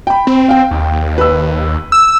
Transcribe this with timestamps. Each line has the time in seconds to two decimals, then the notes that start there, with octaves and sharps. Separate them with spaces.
0.07 G5 B5
0.27 C4
0.48 F5 G5
0.71 D#2
1.18 B4 E6
1.92 E6